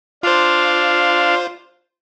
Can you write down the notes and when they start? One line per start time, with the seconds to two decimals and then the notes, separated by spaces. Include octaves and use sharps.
0.23 D4 F4 C5 F5